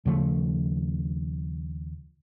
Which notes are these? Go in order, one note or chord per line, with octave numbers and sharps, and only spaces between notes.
D#2 C#3 F3 A3